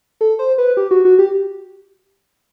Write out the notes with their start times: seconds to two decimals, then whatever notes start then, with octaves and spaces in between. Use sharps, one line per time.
0.21 A4
0.39 C5
0.58 B4
0.77 G4
0.91 F#4
1.05 F#4
1.19 G4